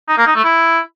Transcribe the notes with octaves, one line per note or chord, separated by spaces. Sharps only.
D#4
A#3
D#4
A3
E4